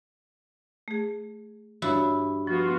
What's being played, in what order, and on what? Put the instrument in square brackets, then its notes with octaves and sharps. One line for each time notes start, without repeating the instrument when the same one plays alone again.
[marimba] A3 G#4
[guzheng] G2 E4 [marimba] F#4 C#5 F5
[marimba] F3 [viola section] B3 F4 F#4